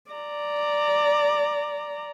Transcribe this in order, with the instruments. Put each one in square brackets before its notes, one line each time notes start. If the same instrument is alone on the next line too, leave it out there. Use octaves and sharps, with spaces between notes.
[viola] D5 A#5